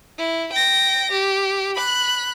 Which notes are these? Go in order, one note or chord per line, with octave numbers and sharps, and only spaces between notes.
E4
G5 A#6
G4
B5 F#6